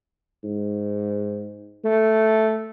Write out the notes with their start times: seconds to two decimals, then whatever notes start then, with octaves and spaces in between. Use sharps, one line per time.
0.44 G#2
1.85 A3